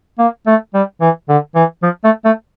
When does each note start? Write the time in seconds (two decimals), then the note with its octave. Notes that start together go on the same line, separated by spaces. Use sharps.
0.19 A#3
0.47 A3
0.74 G3
1.01 E3
1.29 D3
1.55 E3
1.83 F3
2.04 A3
2.25 A3